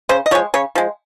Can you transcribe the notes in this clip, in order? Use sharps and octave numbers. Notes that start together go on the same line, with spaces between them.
C#3 C5
D#5
F3 G#3 C#5
C#3 C#5
F3 G#3